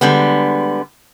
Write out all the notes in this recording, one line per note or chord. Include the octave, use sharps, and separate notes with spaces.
D3 G3 G#3 B3